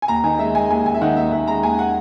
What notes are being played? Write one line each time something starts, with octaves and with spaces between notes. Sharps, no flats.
G#5
D#2 A#5
D#3 G#5
G#3 E5
G#3 G#5
D#2 G#5
D#2 G#5
E5
D#3 F#5
D#2 E5
D#3 E5
G#3 A#5
D#2 G#5
F#5